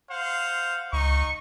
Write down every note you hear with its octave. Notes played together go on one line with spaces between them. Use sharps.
C5 F5 F#5
C#2 D#4 C#6